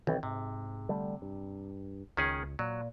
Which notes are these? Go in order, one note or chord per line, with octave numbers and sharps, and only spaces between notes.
B1 D#3 E3 C4
G#2 C3
D3 G3 A3
G2
C#2 D#3 C#4 G#4
A#2 F#3